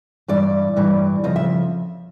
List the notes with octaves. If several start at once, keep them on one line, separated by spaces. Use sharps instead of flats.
G2 E3 D5
G2 E3
F2 C#3 F3 D#5
E5